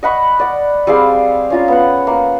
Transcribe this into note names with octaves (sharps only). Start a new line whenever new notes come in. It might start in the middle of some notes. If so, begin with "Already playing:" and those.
D#5 F#5 B5 C#6
D5 F#5
G3 C4 G#4 F5
C#4 F4 A#5
B3 F#5
A#3